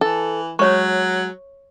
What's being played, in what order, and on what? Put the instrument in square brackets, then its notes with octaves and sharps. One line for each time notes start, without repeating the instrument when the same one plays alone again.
[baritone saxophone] E3 [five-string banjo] A4
[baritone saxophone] F#3 [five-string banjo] G#3 [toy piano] C#5 C#6